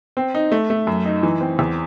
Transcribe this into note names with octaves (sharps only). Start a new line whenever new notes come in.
C4
D#4
A3
A3
F#2
D#4
E3
C4
E2